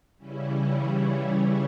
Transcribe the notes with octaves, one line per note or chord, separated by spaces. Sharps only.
C#3 E3 G3 C#4 E4